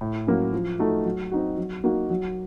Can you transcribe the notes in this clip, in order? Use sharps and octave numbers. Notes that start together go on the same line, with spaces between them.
A2
F#3 A#3 C#4
F3
A3 D#4 F#4
F#3
C4 D#4 F#4
F#3
A#3 D#4 F#4
F#3